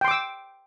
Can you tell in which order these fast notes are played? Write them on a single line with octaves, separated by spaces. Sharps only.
G5 C6 D6 E6